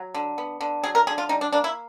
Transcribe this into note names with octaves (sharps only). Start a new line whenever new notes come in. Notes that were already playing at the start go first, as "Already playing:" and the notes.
Already playing: F#3
D3
B3
D3
F#3 G#4
A#4
D3 G#4
F4
G3 D#4
D4
A#3 D4
E4